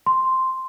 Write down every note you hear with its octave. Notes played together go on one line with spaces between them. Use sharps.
C6